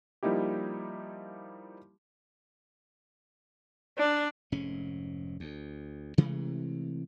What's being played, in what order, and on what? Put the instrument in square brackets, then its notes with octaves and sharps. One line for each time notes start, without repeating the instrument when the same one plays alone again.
[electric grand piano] F3 G3 A#3 D#4 E4 G4
[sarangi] D4
[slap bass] F1 G#2 C#4
D2
C3 E3 G#3 A3